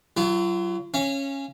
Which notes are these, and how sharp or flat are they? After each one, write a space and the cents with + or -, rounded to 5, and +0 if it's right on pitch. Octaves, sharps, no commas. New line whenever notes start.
F#3 +25 F4 -35
C#4 -10 F5 -35